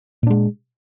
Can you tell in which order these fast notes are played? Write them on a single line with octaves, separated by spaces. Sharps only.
A#2 D4 G#3